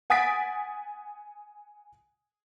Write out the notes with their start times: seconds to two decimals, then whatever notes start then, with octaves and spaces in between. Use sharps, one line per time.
0.10 F#5 G#5 D#6 A6 B6 D7